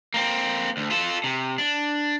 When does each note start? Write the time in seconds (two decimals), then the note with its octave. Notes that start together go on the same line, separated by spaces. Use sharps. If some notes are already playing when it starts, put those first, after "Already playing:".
0.14 A#3 C4
0.77 D2
0.90 F4 A4
1.24 C3
1.58 D4